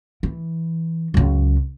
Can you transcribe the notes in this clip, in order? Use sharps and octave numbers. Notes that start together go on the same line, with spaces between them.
E3
C#2 F#2